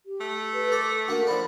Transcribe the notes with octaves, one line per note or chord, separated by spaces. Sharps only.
G4
A3
B4
A4 D6
A#3 D4 F#4
F3 D4 B5